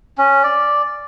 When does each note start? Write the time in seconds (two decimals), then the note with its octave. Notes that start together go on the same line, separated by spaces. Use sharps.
0.18 C#4
0.43 D5